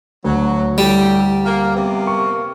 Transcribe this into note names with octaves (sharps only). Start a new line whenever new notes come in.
D2 F#3
A2 G3 G4
A#3
C3 A#3 B3
C#6